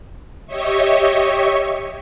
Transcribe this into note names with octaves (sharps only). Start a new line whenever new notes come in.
G4 C#5 D#5 E5 C#6